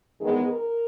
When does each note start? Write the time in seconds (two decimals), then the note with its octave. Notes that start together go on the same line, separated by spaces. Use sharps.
0.21 E2 D#3 G#3 B3 G#4
0.50 A#4